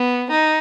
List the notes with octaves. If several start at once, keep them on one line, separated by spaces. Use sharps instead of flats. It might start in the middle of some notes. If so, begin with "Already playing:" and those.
Already playing: B3
D#4